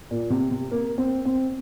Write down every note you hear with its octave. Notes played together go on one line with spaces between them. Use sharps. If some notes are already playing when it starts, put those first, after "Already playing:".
A#2
C3
C3
A#3
C4
C4